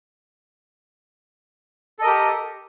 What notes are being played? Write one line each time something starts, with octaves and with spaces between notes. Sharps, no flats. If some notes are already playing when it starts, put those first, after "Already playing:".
G4 A4 A#4 D#5